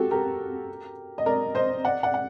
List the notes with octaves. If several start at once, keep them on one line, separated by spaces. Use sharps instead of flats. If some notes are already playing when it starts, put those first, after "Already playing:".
Already playing: F#4 G4 A4
G4 A#4
D#5
A#4 D5
C5 D#5
D5 F#5
D5 F#5
F#5